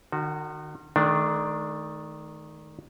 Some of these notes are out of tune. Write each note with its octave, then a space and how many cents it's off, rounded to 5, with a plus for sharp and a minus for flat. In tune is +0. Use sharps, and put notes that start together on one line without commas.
D#3 -40 F#4 +0
D#3 +0 A3 -35 D4 +0